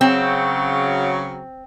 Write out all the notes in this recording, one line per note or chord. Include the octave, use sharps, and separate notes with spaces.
C#3 F#3 C4